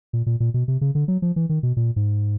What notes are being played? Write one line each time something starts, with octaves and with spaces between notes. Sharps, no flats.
A#2
A#2
A#2
B2
C3
C#3
D3
F#3
F3
E3
D#3
B2
A#2
G#2